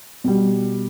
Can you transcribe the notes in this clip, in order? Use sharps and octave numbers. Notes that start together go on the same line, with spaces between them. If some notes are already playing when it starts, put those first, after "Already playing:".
B2 G3